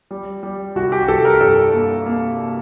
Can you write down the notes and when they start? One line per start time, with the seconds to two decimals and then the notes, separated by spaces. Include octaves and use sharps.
0.11 G3
0.43 G3
0.75 C2 F#4
0.92 G4
1.08 C2 A4
1.25 A#4
1.41 G2 A4
1.73 A#3
2.06 A#3